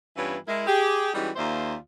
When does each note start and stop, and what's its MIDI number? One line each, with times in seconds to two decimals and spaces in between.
0.16 0.36 43
0.16 0.36 52
0.16 0.36 59
0.16 0.36 61
0.16 0.36 64
0.16 0.36 65
0.47 0.64 56
0.47 0.64 64
0.47 0.64 70
0.66 1.12 67
0.66 1.12 68
1.13 1.29 52
1.13 1.29 55
1.13 1.29 56
1.13 1.29 61
1.13 1.29 63
1.13 1.29 66
1.36 1.75 39
1.36 1.75 58
1.36 1.75 65
1.36 1.75 72
1.36 1.75 74
1.36 1.75 76